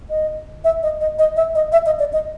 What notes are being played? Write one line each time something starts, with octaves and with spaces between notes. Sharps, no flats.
D#5
E5
D#5
D#5
D#5
E5
D#5
E5
D#5
D5
D#5